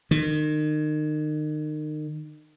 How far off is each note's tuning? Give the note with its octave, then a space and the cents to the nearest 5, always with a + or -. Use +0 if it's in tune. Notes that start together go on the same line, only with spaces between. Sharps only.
D#3 -35